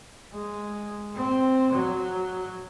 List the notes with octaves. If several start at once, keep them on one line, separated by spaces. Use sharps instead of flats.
G#3
C4
F#3